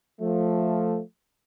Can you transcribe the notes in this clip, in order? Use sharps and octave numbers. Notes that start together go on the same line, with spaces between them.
F3 A3